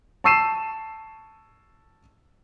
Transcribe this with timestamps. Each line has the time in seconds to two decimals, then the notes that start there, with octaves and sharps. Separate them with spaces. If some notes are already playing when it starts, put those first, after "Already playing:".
0.24 A5 C#6 E6 C7 D#7 E7